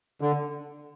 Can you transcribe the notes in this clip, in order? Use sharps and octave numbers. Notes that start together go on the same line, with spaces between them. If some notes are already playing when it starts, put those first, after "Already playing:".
D3